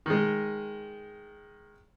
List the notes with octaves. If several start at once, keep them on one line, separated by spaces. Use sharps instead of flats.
D#3 G#3